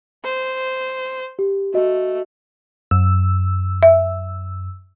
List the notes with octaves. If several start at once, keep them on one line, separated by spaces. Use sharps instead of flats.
C5
G4
A3 F#4 D#5
F#2 E6
E5